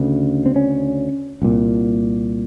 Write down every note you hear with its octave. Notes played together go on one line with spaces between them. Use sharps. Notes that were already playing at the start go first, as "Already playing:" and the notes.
Already playing: D2 C#3
C4
C#4
C2 A#2